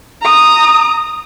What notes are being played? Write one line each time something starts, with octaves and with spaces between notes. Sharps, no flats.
A#5 D#6